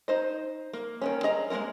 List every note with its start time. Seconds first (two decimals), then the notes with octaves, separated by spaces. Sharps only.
0.08 D#4 C5 D#5
0.73 A#3
1.02 D#3 E3 C#4
1.23 G#4 D#5 A#5
1.50 G#3 A#3 C#4 E4 A#4